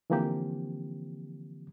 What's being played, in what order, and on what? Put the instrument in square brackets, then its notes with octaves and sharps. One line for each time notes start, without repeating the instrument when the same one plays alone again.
[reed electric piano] D3 E3 F3 A#3 C4 G4